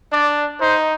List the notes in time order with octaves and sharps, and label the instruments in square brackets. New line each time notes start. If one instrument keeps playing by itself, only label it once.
[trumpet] D4 [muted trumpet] D5
[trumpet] D#4 [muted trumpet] C5